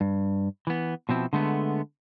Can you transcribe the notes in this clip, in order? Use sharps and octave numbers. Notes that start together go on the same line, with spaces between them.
G2
E3 B3
B2 F3 C4 E4
D3 G#3 A3 B3